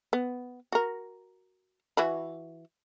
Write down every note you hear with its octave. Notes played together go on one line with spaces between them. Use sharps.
B3
F#4 A#4
E3 F#4 B5